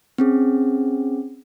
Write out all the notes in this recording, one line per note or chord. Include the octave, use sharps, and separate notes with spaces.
C4 C#4 G#4